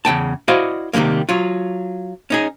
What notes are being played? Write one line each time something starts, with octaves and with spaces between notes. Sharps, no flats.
E2 C#3 G5 A5
E4 F#4 C5 D5 D#5 F5
C3 D#3 G3 G#3 A#3
F#3 F4
C#4 D#4 G#4